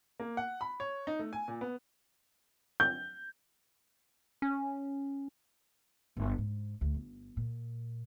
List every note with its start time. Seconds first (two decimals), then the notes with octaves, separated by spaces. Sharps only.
0.20 A#3
0.37 F#5
0.61 B5
0.80 C#5
1.07 D#4
1.20 A3
1.33 G#5
1.48 A#2
1.61 B3
2.80 G6
4.42 C#4
6.17 G1
6.38 G#2
6.81 D2
6.94 G1
7.37 A#2